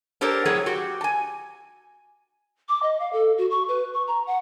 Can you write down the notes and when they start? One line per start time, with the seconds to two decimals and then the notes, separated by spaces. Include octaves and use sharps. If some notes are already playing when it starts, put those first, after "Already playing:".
0.21 D4 G4 A4 A#4 C5 C#5
0.45 A2 F#3 G#4 A4 C#5
0.66 F#4 G4
1.01 G#5 A5
2.69 D6
2.83 D#5
3.00 F5
3.13 A4
3.38 F#4
3.51 C#6
3.68 B4
3.94 C#6
4.08 A#5
4.27 F#5